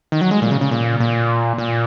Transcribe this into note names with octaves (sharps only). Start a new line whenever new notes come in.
D#3
F#3
G#3
A#2
C#3
C#3
A#2
A#2
A#2